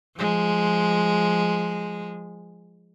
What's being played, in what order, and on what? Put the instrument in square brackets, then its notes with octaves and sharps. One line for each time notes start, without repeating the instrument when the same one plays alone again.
[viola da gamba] F3 G#3